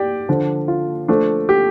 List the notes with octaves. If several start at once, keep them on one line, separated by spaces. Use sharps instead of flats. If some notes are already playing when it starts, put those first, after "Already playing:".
Already playing: G4 D5 G5
D3 F3 D4
F4
F3 A3 D4
G4